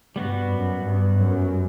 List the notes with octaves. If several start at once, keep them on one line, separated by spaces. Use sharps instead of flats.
G2 G3 B3 F#4
F#2
G2
F#2